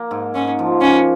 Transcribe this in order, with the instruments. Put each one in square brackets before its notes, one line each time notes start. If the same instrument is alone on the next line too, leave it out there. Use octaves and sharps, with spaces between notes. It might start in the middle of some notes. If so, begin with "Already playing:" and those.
Already playing: [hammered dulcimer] A#3
G#2
[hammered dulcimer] G#2 [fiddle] C#4
[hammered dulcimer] F3
[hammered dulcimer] A#3 [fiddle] C#4